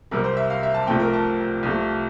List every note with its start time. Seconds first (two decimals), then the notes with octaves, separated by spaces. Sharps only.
0.11 C2 C3 G3 C4 A#4
0.24 C5
0.37 E5
0.50 F5
0.63 E5
0.74 A5
0.87 C2 C3 F3 A3 C4 G5
1.00 A#4
1.13 A5
1.63 C2 C3 F3 A3